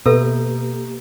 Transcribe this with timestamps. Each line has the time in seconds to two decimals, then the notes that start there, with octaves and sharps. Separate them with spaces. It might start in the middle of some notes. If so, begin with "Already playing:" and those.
0.06 B2 A#3 G4 A4 B4 E5